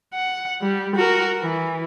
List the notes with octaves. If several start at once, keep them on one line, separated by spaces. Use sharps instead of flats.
F#5
G3
F#4 A#4
E3